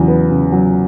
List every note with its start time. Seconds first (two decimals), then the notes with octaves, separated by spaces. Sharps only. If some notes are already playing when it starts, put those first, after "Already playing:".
Already playing: E2 C#3 F#3
0.08 B3
0.31 C#3
0.52 F#3